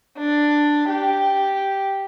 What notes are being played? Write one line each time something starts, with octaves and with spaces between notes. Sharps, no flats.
D4
G4